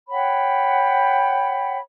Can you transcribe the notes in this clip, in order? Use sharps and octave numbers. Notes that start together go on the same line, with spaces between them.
C#5 F#5 G5 B5